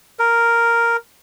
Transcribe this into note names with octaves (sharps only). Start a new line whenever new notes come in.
A#4